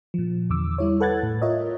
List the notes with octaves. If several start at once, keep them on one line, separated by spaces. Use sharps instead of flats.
A#2 F3
E2 D3 D6 E6
G3 E4 C#5
A4 B4 F#5 F#6 G#6 A6
A2
F4 A#4 C#5 D#5 E5